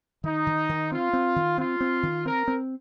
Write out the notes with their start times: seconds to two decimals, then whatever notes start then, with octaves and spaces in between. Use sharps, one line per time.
0.24 D#3 D#4
0.47 D#3
0.69 D#3
0.92 C4 F4
1.13 C4
1.36 D#3
1.58 C4 F4
1.81 C4
2.03 D#3
2.26 C4 A#4
2.48 C4